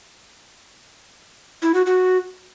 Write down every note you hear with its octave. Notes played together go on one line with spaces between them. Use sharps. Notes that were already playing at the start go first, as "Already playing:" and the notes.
E4
F#4
F#4